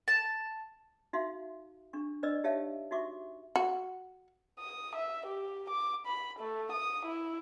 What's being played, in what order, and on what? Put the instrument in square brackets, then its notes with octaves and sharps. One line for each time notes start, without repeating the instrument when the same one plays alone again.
[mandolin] A5
[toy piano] D#4 F#4 E5 F5 C6
D4 C#6
D4 B4 D5 D#5 E6
D#4 G4 C#5 E5 F5 A5
D#4 F#4 E5 C#6 D6
[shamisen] F#4
[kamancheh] D#6
E5
G4
D6
B5
A3
D#6
E4